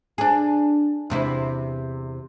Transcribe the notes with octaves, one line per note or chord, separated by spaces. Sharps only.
D4 G#4
E2 C3 E4